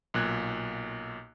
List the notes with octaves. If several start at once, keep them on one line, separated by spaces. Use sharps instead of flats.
B1 A#2 F#6 G#6